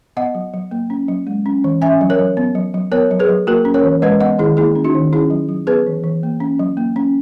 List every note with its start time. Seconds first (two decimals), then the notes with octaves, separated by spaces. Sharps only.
0.17 B3 D#5 F#5
0.35 F#3
0.54 F#3
0.71 A#3
0.90 C#4
1.08 F#3
1.27 G#3
1.46 C#4
1.64 E3
1.81 C#4 E5 G#5
2.01 F#3
2.10 A#4 C#5
2.19 F#3
2.37 B3
2.55 F#3
2.74 F#3
2.92 B3 A#4 C#5
3.11 F#3
3.19 G#4 B4
3.29 F#3
3.47 A#3 F#4 A#4
3.65 C#4
3.74 A#4 C#5
3.84 E3
4.02 G#3 B4 D#5
4.20 B3 D#5 F#5
4.38 D#3 E4 G#4
4.57 A#3 E4 G#4
4.75 C#4
4.84 D#4 F#4
4.95 D#3
5.13 C#4 E4 G#4
5.30 F#3
5.49 F#3
5.67 B3 G#4 B4
5.87 E3
6.04 E3
6.23 A#3
6.40 C#4
6.59 F#3
6.77 A#3
6.96 C#4